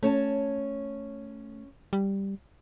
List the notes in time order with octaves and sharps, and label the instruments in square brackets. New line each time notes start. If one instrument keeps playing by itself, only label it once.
[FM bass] A3 [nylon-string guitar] C#4 C#5 A5
[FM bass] G3